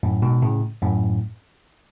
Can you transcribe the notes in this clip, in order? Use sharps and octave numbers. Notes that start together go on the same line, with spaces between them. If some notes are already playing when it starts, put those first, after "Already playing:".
F#2 A2
G#2 B2
A2 C#3
F#2 A2